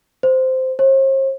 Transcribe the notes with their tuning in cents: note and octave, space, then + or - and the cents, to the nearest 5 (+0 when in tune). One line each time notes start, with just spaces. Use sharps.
C5 -10
C5 +45